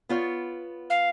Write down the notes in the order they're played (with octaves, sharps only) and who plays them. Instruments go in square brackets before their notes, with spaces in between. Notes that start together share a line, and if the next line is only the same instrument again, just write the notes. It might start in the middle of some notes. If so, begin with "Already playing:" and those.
[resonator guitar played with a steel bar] B3 F4 C#5
[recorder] F5